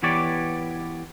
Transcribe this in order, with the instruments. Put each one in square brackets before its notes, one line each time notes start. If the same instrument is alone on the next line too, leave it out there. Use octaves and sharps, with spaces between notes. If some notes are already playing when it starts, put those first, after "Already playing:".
[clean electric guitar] E3 B3 G4 C#5 D5